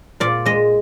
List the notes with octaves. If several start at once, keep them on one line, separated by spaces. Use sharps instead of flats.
A#2 D5
G#3 D#5